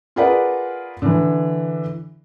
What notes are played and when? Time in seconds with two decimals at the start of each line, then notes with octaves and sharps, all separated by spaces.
0.16 F4 G#4 A#4 B4 D5 F#5
1.02 D3 E3